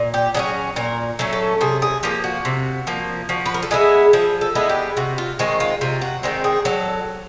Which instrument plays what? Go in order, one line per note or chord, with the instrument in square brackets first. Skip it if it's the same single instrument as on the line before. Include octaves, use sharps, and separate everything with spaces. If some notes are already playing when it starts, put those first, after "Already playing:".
Already playing: [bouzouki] A#2
G4
F#3 A3 C#4 G#4
A#2 A#4
F#3 A3 C#4
A4
C3 G#4
G#4
F3 A#3 G4
F#4
C3
F3 A#3
F3 F#4
B4
A#4
A4
G#3 B3 E4 G#4
F3 G#4
A4
G#3 B3 E4
G4
C3 F#4
F4
D#3 G#3 C4 F#4
F4
C3 F4
F#4
D#3 G#3 C4
G#4
F#3 A4